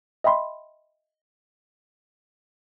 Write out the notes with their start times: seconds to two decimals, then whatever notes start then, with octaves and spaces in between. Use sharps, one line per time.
0.24 D#5 E5 G5 B5 C6